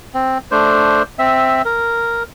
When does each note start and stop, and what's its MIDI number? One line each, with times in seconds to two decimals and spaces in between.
0.14 0.38 60
0.51 1.03 57
0.51 1.03 62
0.51 1.03 72
1.19 1.62 60
1.19 1.62 76
1.65 2.23 70